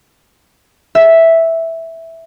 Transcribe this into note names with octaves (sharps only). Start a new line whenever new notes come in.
E5